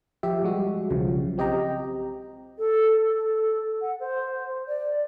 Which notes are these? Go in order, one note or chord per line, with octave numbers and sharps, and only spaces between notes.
F3 G4 E5
F3 G3 G#3 F#4
B1 C#3 F3 F#3
C4 G4 D#5 G5 A#5
A4
A4
F#5
C5
D5